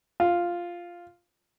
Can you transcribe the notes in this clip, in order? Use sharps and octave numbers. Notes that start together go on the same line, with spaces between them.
F4